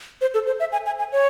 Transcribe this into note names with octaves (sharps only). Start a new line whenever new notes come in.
C5
A4
C5
E5
G#5
G#5
G#5
C#5